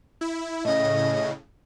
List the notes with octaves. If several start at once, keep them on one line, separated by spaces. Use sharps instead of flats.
E4
A2 C#3 D#5